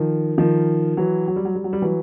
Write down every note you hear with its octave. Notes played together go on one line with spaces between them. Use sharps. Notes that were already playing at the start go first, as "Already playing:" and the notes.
Already playing: D#3 F3
D#3 F3
E3 F#3
F#3
G3
F#3
G3
F#3
G3
E3 F#3